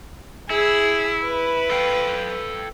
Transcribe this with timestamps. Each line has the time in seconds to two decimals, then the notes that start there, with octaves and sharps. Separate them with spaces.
0.50 E4 G#4 E6
1.25 B4
1.70 A4 F5 G5